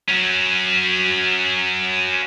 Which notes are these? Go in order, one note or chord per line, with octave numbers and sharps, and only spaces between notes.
F#3 C#4